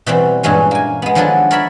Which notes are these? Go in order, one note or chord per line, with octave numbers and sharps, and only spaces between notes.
B2 E3 G3 C4
G2 A#2 E3 G#3 C#4
A#3 G#5
G#3 B3
D#3 F3 F#3 G#3 D4 A4
A#4 C#5 D5 E5 B5